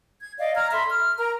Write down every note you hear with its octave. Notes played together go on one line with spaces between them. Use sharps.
G#6
D5 D#5 F5
A#5 F6 G#6
A4 E5 B5 C6
F6
A#4 A#5